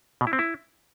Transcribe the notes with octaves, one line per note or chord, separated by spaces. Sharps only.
B2
E4
C4
E4